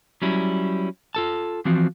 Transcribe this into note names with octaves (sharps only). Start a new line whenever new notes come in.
F#3 G3 C#4 E4
F4 A4 A5
E3 F3 C4 F#4